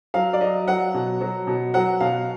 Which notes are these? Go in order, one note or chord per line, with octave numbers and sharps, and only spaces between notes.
F#3 F5
D5
F#3 D#5
F#3 F#5
B2
F#3
B2
F#3 F#5
B2 F5